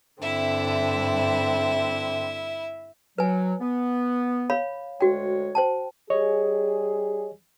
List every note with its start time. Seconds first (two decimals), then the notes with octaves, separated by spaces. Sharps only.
0.21 G2 D3 C4 E4 E5
3.18 F#3 B4 G#5
3.61 B3
4.50 C#5 F5 B5
5.01 D2 G#3 F#4 C#5 G5
5.55 C5 G5 A5
6.10 G3 G4 G#4 C#5 D#5